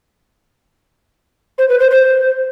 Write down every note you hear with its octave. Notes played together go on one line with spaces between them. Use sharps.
C5
B4
C5
C5